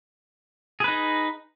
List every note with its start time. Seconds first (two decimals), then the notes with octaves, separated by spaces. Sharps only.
0.80 G#4
0.84 B4
0.88 D#4